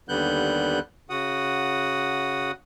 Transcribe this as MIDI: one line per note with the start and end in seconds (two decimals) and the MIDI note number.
0.09 0.79 39
0.09 0.79 50
0.09 0.79 55
0.09 0.79 59
0.09 0.79 90
0.09 0.79 91
1.10 2.51 49
1.10 2.51 66
1.10 2.51 78
1.10 2.51 87